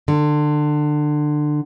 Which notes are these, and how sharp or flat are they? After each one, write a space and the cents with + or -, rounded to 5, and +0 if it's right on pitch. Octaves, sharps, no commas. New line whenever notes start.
D3 +25